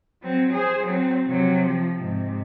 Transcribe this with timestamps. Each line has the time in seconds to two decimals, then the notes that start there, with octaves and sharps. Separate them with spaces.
0.23 F#3 C4
0.54 G#4 C5
0.84 F#3 C4
1.27 C3 F#3
1.66 F3
1.97 G#2 C3